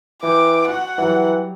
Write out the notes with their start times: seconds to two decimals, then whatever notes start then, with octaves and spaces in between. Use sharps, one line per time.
0.23 E3 G5 D6
0.68 F#4 F#5
0.98 E3 F#3 G3